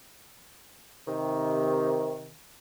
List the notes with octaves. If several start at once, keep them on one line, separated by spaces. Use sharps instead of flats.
C3 D#3